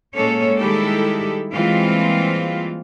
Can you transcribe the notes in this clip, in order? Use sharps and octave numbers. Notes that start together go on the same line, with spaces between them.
A#2 G#3 A#3 C#4 A4 C#5
D#3 G3 G#3 E4 G4 A4
E3 G3 G#3 A#3 C4 F4